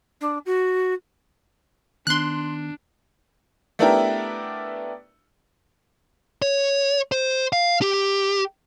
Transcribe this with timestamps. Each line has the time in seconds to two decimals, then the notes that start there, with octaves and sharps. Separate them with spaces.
0.21 D4
0.46 F#4
2.07 D#3 B3 D4 C6 F#6
3.79 A3 B3 D4 E4 G4 A#4
6.42 C#5
7.12 C5
7.53 F5
7.82 G4